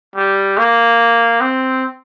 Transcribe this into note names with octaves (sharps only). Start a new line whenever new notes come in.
G3
A#3
C4